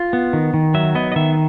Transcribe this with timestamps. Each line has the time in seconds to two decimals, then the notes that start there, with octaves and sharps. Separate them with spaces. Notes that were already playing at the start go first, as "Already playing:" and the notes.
Already playing: F4
0.13 B3
0.33 D#3
0.54 D#3
0.74 F#3 E5
0.95 B3 D#5
1.12 D#5
1.16 D#3 E5